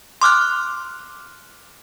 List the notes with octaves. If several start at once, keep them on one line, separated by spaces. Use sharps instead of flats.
C6 D6 F6 F#6